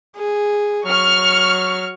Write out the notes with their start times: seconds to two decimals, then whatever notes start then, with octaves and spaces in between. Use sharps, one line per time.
0.17 G#4
0.88 F#3 C#6 F6